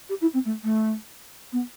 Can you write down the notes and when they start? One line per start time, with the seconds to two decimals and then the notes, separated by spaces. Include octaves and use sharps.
0.09 G4
0.21 E4
0.33 C4
0.45 A3
0.63 A3
1.52 B3